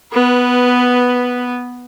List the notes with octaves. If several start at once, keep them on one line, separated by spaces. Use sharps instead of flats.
B3 B4